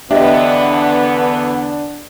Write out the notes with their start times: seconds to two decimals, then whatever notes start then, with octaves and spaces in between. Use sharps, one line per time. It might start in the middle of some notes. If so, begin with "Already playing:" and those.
0.11 E2 D3 B3 D4 G4 D#5 E5